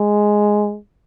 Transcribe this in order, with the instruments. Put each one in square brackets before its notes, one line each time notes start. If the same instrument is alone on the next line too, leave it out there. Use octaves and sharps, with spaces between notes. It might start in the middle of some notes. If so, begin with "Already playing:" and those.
Already playing: [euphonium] G#3